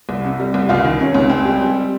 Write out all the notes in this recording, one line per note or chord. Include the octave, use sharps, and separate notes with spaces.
C2
C3
G3
C2
C#2 F4
D#3
C3 C#4
C#2
C#2 C4
G3
G3